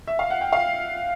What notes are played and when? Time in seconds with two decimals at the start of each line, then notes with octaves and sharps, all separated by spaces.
0.07 E5
0.19 F5
0.30 F#5
0.41 G5
0.53 F5